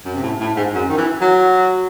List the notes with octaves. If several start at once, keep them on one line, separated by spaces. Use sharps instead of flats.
F#2
C3
A2
A2
G#2
F#2
D#3
E3
F#3